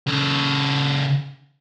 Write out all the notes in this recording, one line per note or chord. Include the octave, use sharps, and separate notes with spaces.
C#3 A4